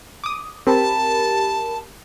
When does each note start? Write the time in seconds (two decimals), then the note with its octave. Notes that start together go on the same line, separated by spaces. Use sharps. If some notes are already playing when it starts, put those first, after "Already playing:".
0.24 D6 D#6
0.67 C4 G4 A#4 A5 B5